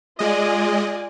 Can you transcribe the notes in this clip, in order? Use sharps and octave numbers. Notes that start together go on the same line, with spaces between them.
G#3 F4 D5 D#5 G#5